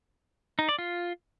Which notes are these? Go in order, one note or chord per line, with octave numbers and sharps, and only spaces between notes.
D#4
D5
F4